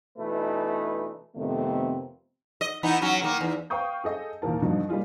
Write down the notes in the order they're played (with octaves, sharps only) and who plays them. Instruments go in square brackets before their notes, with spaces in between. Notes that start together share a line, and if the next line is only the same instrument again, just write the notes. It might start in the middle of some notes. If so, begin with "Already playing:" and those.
[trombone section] B2 E3 A3 D4 D#4 B4
[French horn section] F2 C3 D#3 A3 B3
[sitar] D#5
E3 B3 D#4
F#3 C#4
D#3 A#3
E2
[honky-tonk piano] B4 F5 G5 C#6 D#6 G6
G#4 A4 D#5
D#2 A#2 E3 A#4 A5
G2 B2 D3 D#3 F3 F#3
G3 A#3 D#4 F4 G#4